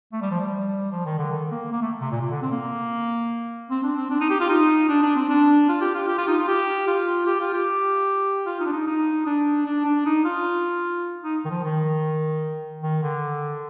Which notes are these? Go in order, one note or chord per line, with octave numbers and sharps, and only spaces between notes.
A3
G3
F3
G3
F3
D#3
D3
D#3
A#3
A#3
A3
C3
A#2
C3
D3
C4
A#3
C4
D4
C4
D4
D#4
G4
F4
D#4
D4
D4
C4
D4
F4
G4
F4
G4
F4
D#4
F4
G4
F4
G4
F4
G4
F4
D#4
D4
D#4
D#4
D4
D4
D4
D#4
F4
D#4
D#3
F3
D#3
D#3
D3